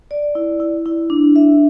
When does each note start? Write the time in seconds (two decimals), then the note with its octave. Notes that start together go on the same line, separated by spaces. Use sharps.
0.11 D5
0.35 E4
0.60 E4
0.86 E4
1.10 D4
1.36 E5